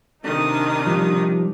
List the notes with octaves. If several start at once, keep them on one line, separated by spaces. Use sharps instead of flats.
C3 D#3 D4 D#4 D#6
F3 G3